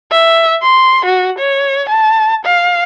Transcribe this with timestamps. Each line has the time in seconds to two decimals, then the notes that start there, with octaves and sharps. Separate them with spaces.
0.11 E5
0.62 C6
1.05 F#4
1.38 C#5
1.89 A5
2.45 F5